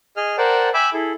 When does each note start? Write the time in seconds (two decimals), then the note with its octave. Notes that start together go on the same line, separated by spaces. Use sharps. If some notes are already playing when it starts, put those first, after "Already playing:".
0.17 G#4 D#5 F6
0.38 A#4 C5 D5 F#5 G5 A5
0.74 E5 G5 G#5 B5 D6 E6
0.93 E4 G#4 A4